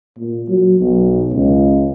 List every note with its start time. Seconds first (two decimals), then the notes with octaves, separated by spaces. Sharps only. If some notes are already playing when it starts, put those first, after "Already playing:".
0.18 A#2
0.49 F#3
0.80 B1
1.33 C#2